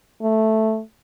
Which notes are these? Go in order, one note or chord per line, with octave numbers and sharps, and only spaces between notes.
A3